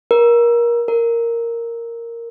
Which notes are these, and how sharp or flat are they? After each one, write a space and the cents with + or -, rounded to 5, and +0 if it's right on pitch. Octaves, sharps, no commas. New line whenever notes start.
A#4 +25
A#4 -5